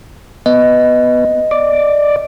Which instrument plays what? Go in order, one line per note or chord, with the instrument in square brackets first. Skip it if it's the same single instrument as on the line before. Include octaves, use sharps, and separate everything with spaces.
[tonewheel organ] B3 [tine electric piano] D#5
[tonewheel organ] D5